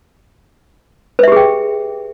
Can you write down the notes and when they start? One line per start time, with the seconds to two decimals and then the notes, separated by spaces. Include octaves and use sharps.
1.19 B4
1.23 E5
1.28 G4
1.32 G#4
1.36 G5